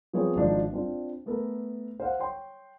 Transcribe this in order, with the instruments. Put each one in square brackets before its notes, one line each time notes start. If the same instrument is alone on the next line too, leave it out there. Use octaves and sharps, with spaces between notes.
[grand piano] F3 B3 C4 G#4 C#5
G#1 G#2 F3 D4
C4 D4 F4
A3 B3 A4 A#4
C5 F5 F#5
C#5 G5 C6